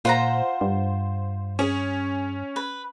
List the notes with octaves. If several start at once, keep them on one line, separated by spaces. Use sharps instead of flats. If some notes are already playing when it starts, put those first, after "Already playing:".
A#2 F4 C5 F#5 A#5
G2
C#4 G#4
B4